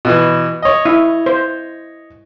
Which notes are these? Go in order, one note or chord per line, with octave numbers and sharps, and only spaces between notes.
B2 E3
C#5 D#5
E4
C5